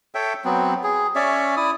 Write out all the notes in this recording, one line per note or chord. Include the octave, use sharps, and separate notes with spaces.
A4 C#5 E5 G5
F#3 B3 C4
G#4
C#4 C#5 D5 E5
E4 D5 D#6